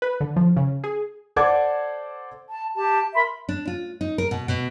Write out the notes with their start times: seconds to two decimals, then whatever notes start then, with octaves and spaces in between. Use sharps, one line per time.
0.02 B4
0.21 D3
0.36 F3
0.57 C#3
0.84 G#4
1.36 A4 C5 D5 F#5 D6 G#6
2.49 A5
2.75 G4 A5
3.14 A#4 E5 B5 C6
3.49 D4
3.67 F4
4.01 D#4
4.18 A#4
4.31 B2
4.48 B2